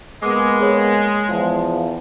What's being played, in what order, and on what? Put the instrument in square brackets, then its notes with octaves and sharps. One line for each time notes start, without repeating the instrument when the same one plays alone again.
[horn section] G#3 [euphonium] A#3 [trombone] B3 [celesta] D6
[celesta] G#4 C#5
[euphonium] E2 [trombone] F3